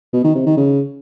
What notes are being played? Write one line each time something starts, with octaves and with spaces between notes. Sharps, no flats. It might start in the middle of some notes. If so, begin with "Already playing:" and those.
B2
D#3
C3
D#3
C#3